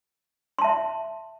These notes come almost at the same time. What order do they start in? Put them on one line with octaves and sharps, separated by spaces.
C6 A5 E5